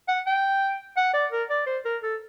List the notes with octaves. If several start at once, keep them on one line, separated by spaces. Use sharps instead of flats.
F#5
G5
F#5
D5
A#4
D5
C5
A#4
A4